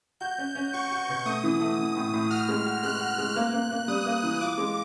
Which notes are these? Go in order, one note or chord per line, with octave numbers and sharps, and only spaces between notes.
F#4 G6
C#4
C#4
F#4 C#6
F#4
B2
A3 D#6
E3
A3
E3
A2
A2
F#4 F6
G#3
F#4
G#3 F#6
F#4
G#3
A#3
A#3
A#3
G3 D#6
A#3
E3
F4 D6
G#3